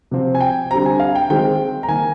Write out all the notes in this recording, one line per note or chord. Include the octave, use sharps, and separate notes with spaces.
C3 F3 C4
G#5
G5
D3 G3 C4 A#5
G#5
F5
G5
D#3 G#3 C4 G5
A#5
D#3 A#3 G#5